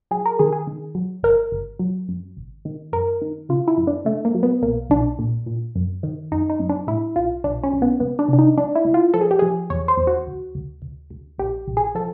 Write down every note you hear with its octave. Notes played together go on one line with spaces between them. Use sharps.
F#3 G#4
A#4
D#3 G#4
G#4
D#3
F#3
G1 A#4
G1
F#3
F#2
G#1
D#3
F#2 A#4
D#3
C#3 F4
E4
F#2
D4
C#3 A3
A#3
F#3
B3
B1 A#3
B1 D4
A#2
A#2
F#2
D#3
F#2 D#4
D#4
F#2
D4
A2 E4
B1 F4
B1 D4
C#4
B1
B3
C#2 B3
D4
C3
D4
D#4
C#2 D4
E4
C#2
F4
F3 A4
G#4
G4
F3 G#4
E2 C#5
C5
E2
F#4
D2
D2
D2
D2
A#1 G4
A#1
G#4
F3 A4